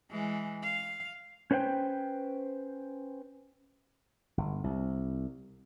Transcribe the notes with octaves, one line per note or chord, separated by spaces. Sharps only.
E3 G#3
F5
C#4 B4 C5 F#5 G5
G1
C2